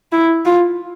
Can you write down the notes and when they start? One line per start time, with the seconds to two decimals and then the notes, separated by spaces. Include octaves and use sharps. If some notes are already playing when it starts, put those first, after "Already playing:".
0.12 E4
0.45 F4